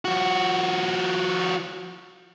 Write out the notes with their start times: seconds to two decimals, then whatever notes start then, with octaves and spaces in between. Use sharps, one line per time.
0.05 F3 F#4